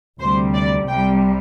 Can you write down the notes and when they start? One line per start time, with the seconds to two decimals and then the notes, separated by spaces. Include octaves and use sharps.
0.19 D2 C3 G3 C5
0.54 D5
0.88 C2 C3 G3 G5